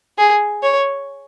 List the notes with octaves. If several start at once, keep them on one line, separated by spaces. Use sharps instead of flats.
G#4
C#5